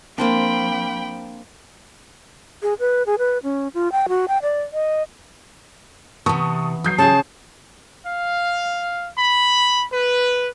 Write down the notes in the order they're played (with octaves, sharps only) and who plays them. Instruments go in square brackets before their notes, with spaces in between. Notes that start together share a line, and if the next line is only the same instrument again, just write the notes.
[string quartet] F3 G5 B5 [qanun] A#3 C4 D4
[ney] G#4
B4
G#4
B4
C#4
F4
G5
F#4
G5
D5
D#5
[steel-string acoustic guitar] C3 E3 [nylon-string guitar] B3 [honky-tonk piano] A5 C#6 D#6
[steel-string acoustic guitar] F#3 [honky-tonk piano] D#6 G6 C7
[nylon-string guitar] C#3 G#4 [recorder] A5
[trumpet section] F5
B5
B4